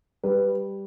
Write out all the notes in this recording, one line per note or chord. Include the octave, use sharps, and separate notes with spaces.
G3 B4